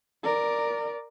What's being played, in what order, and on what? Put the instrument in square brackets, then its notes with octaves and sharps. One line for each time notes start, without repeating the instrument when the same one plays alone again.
[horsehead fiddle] A#4 D5